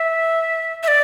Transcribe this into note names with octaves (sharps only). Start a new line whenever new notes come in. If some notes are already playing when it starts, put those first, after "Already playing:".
Already playing: E5
E5
D5